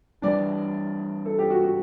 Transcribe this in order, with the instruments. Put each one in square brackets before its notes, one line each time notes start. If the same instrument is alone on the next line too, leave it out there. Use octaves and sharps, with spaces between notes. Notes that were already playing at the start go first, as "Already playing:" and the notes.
[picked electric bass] E3 G3 D4 [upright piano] D5
[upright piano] A4
G4
F#4
F#4